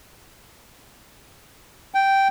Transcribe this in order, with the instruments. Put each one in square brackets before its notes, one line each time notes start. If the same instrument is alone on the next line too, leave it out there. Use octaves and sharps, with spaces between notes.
[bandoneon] G5